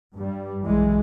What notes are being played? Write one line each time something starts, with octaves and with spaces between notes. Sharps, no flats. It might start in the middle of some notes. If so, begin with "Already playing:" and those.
G2 G3
B1 E3 G#3